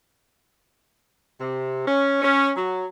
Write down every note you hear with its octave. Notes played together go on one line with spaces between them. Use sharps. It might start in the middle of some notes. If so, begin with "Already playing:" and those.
C3
C#4
C#4
F#3